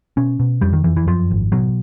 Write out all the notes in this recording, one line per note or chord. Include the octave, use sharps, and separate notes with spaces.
B2 C#4
B2
F2 G3
D#3
F2 E3
E3
F#2 F3
G#1
B2 F#3